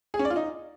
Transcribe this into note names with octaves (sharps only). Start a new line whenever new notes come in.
G#4
C#4
D5
F4
D#4